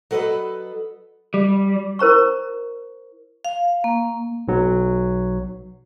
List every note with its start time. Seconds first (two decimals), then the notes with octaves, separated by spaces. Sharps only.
0.11 F#3 A4 B4 D5 D#5
1.34 G3
1.99 E4 A#4 C5 A#5 C#6
3.45 F5
3.84 A#3
4.48 B1 F#3